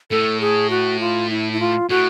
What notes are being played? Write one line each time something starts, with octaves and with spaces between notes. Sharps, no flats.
A2 A4
G#4
F#4
F4
E4
E4
F4
A2 F#4